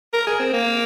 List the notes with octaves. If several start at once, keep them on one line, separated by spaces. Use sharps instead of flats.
A#4
G#4
C4
A#3